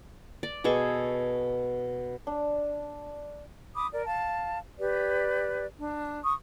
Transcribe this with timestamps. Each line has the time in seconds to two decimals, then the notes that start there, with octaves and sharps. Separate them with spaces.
0.43 D5
0.64 B2 G#4 A4 C#6
2.27 D4
3.75 B5 D6 D#6
3.92 A#4 D5
4.06 F5 A5
4.78 G4 B4 D5
5.78 D4
6.23 C#6 D#6